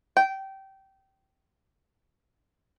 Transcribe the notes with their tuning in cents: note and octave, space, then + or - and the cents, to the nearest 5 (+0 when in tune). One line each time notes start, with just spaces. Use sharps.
G5 -20